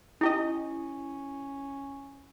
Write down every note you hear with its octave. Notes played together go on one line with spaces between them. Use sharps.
C#4 D#4 E4 G4 D#5